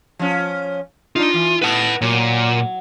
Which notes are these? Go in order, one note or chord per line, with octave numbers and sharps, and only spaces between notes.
F3 C#4
D4 D#4 F4
E3
A3 B3 E4 B4 A5
A#2 F#3